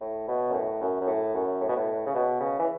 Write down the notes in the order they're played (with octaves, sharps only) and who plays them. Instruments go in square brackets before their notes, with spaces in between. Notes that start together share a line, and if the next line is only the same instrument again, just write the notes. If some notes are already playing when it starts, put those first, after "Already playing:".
[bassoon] A2
B2
F#2
A2
F#2
F#2
A2
F#2
A2
B2
A2
C#3
B2
C#3
E3